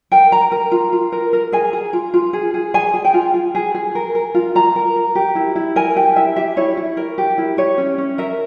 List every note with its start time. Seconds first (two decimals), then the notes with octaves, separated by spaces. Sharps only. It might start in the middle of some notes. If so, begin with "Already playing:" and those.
0.12 A#4 G5
0.32 A#4 A#5
0.52 A#4
0.72 F4
0.93 F4
1.12 A#4
1.33 A#4
1.52 G#4 G#5
1.73 G#4
1.93 F4
2.14 F4
2.33 G#4
2.54 G#4
2.74 G#4 G#5
2.94 G#4
3.05 G5
3.14 F4
3.34 F4
3.55 G#4
3.75 G#4
3.95 A#4
4.15 A#4
4.34 F4
4.55 F4 A#5
4.76 A#4
4.96 A#4
5.15 G4
5.35 E4
5.56 E4
5.76 A#4 G#5
5.96 G4 G5
6.16 E4 E5
6.36 G4 E5
6.57 E4 C#5
6.77 E4
6.97 A#4
7.18 G4
7.38 E4
7.57 G4 C#5
7.78 C#4
7.98 C#4
8.18 A#4 E5